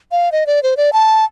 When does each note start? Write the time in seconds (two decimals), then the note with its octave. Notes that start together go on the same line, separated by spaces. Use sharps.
0.12 F5
0.32 D#5
0.46 D5
0.63 C5
0.77 D5
0.93 A5